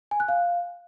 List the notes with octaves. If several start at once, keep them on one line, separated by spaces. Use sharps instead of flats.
G#5
F#6
F5